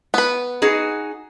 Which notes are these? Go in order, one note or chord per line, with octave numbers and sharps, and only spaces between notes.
B3 B4
D#4 F#4 G#4